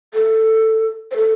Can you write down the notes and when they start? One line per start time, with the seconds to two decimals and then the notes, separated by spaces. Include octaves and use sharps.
0.14 A4
1.11 C5
1.16 A4